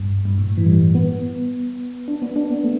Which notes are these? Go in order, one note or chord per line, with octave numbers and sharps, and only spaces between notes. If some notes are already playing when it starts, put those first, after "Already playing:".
Already playing: G2
G2
A2
E3
G3
B3
D4
B3
D4
B3
A3